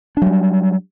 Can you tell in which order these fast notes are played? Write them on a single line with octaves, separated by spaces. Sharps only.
D4 F#3 G3